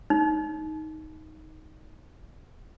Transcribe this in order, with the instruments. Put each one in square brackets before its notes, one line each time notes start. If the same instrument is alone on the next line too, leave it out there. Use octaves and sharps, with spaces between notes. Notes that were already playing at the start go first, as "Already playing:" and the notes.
[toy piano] D#4